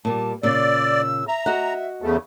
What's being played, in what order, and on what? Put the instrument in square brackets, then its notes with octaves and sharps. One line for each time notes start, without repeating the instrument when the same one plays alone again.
[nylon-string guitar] A#2 G3 [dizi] A5
[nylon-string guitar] A#2 C#3 [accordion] D5 [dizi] E6
[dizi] E5 [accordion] A#5
[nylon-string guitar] F#4 D#5 F#5
[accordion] E2 C#3 A3